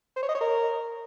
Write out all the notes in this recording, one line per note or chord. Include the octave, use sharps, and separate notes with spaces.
C5
C#5
D#5
C#5
A#4